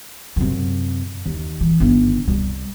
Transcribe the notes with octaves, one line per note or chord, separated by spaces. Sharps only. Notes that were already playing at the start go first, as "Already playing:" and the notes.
F#2 C3
D#2
E3
G1 D#3
C2 G3